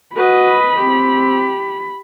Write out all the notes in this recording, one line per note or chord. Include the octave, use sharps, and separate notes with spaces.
F#4 B4 D#5 B5
C4 G4